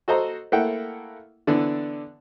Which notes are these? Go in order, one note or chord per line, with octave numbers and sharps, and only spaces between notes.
F#4 A4 C5 D#5 A#5
A3 A#3 E4 F#5 G5
D3 E3 B3 D4 D5